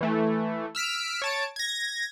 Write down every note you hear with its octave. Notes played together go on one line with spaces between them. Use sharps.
E3 A3
E6 F6 B6 D7
C#5 A5 D7
G#6 A#6